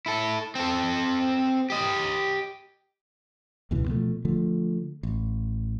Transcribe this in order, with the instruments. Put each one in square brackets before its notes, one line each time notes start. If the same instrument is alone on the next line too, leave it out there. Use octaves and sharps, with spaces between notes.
[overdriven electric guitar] E4 A4
C4 A4
G4 D#5
[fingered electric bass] C#2 F#2 B2 E3
B2 F3 A3
D3 F3 A3
A1